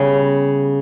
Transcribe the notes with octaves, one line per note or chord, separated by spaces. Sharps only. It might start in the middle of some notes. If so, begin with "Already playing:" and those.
Already playing: C#3 G3 B3